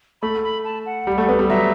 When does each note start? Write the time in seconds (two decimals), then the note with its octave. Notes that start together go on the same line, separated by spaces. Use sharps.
0.22 A3 B5
0.43 B5
0.64 A5
0.86 F#5
1.07 G3
1.18 A3
1.29 B3
1.39 G3
1.50 F#3 E5